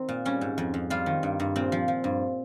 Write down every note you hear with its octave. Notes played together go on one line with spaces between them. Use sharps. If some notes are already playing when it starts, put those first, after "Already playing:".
Already playing: D#3 C4
A#2
G3 C#4
G#2
F2
F2
G3 F4
D#3
G2
G2
A#2 C4
F3
F3
G2